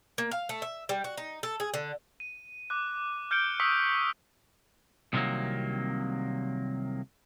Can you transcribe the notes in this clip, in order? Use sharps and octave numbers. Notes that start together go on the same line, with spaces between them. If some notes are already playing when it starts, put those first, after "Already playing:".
A#3
F5
A3
E5
G3
F#4
D#4
A4
G#4
D3
D#7
D6 F#6
F6 G6 C#7 D7 G7
C#6 D#6 E6 B6 C#7
C2 C3 D#3 F3 F#3 A#3